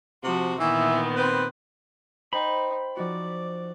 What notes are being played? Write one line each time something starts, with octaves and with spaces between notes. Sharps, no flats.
C3 F3 F#4
A#2 D#3 E3 B3 E5
C4 B4
D#4 C5 G5 B5 C6
F3 D#4 F#4 D5